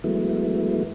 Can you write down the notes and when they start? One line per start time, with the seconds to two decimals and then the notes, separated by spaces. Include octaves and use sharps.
0.04 E3 F#3 G#3 A3 B3 E4